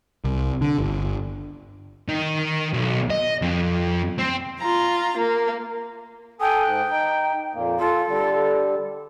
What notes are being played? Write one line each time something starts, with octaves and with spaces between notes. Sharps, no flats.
C2
D3
G1
D#3
B1
D#5
F2
C4
F4 A#5
A#3
A4 G5 G#5 D#6
G#2 F#6
D#4
F2 A#2 A#3
F4 A4
D3 G3